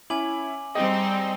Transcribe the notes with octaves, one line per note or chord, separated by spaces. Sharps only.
C#4 E4 G#5 D6 F#7
G3 C4 D#4 G#4 D#5 G5